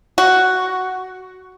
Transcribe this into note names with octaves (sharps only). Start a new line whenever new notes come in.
F#4